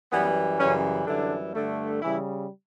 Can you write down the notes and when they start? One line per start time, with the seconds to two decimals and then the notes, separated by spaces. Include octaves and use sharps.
0.11 F#2 E3 G3 B3
0.59 F#2 C#3 E3 G3 C#4
1.06 F#2 D3 E3 G3 D4
1.54 G2 D3 A3
2.01 C#3 E3 G3 E4